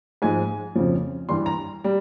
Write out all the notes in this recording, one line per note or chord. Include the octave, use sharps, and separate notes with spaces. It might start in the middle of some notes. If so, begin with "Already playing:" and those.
G#2 F3 G#3 G#5
F2 C#3 F3
G2 E3 G3 C6
A#5
G3